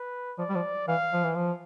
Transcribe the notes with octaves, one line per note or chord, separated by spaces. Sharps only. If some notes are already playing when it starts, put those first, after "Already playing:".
Already playing: B4
F3 D5
G3
F3
E3 F5
F3
E3
F3